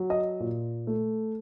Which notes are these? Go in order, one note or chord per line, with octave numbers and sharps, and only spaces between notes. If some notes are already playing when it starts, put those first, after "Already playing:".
Already playing: F#3
D#5
A#2
A3